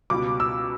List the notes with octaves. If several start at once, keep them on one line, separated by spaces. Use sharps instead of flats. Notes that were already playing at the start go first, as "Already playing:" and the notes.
C#2 B2 G3 D6
E6